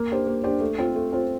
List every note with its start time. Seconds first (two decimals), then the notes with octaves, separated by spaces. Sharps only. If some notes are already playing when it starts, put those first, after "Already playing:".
Already playing: A#3
0.10 D4 G4 C5
0.27 A#3
0.44 D4 G4 C5
0.61 A3
0.78 C4 F4 C5
0.96 A3
1.12 C4 F4 C5